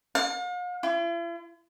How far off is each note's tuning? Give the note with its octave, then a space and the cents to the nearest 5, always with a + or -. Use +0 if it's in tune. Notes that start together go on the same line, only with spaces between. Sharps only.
F5 +45
E4 +45